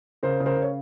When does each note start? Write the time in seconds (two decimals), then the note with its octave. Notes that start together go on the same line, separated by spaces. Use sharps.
0.23 C#3 A#4 C5
0.40 C#3
0.46 A#4 C5
0.56 C#3
0.62 C#5